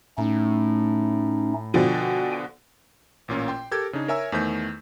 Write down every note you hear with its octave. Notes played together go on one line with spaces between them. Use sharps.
A2 A3 C#4 D#4
B2 D3 F3 G5 G#5
A1 A#2 C#4 F4
G5 C6
G4 A4 A#4 G#6
C#3 D4 D#4
A#4 C#5 E5 G#5 A#5 E6
E2 D#3 A3 C5 G6 B6